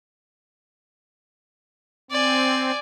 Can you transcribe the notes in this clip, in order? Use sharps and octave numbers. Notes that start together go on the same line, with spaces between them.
C4 D5 G#5